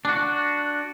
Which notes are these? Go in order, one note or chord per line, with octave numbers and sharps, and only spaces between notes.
D4 F#4